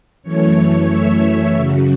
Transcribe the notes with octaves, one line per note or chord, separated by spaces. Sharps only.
F#2 E3 A3 C#5
C#5
E5
F#2 C#3 F#3